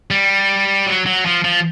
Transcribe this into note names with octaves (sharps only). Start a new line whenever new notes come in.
G3
F#3
F#3
F3
F3